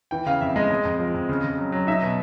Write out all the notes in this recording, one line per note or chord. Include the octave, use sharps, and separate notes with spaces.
E3 G5
C#3 F5
F2 E5
G#3 D#5
G#3 D#5
F2
F3
F2
C#3
C#3
F#3
F#3
D#4 E5
B2